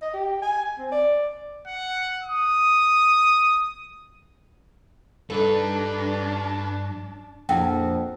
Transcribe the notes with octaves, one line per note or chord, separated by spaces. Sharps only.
D#5
G4
G#5
C4
D5
F#5
D#6
G2 D4 D#4 A4 B4 A5
A#1 F2 E4 F#5 G5